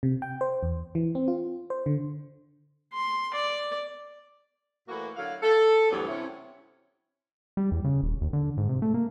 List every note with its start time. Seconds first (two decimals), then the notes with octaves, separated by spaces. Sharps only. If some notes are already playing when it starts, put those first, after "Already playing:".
0.03 C3
0.22 G5
0.41 C5
0.63 E2
0.95 E3
1.15 C4
1.28 F4
1.70 C5
1.86 D3
2.93 C6
3.34 D5
4.88 A2 E3 A#3 F#4
5.16 D3 F#3 E4 F5
5.42 A4
5.91 D2 G2 E3 F#3 G3 B3
6.08 C3 C#4 E4
7.57 G3
7.72 E2
7.84 C#3
8.02 D#1
8.21 D#2
8.33 D3
8.57 G#2
8.69 C3
8.82 A3
8.94 A#3